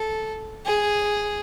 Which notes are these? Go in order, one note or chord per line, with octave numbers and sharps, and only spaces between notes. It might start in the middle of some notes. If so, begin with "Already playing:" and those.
Already playing: A4
G#4